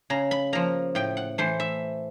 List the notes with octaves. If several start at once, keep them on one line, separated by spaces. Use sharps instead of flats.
C#3 A#5
B5
F3 A#3 A#5
A2 G5
F#5
E3 A3 C5
E5